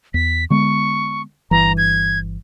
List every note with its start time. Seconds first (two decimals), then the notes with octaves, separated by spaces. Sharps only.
0.14 E2 B6
0.50 D3 G#3 B3 C#6
1.51 G1 E3 A#5
1.77 G#6